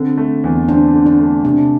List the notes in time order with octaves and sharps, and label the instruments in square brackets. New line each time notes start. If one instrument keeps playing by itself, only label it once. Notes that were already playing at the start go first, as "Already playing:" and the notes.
Already playing: [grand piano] D3 [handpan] C4
[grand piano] A3
E2
[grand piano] C4 [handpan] D4
[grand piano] D3
[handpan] D4
[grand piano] A3
[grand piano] C3 [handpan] D4